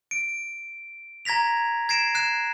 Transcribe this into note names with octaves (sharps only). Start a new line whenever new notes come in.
D7
A#5 G#6 A#6 B6 F7
G#6 A#6 C7 D7 E7
F#6 C7 E7